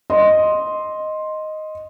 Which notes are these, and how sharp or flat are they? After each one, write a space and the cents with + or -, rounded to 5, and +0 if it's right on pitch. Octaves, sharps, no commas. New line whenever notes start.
D#5 +0 C6 +0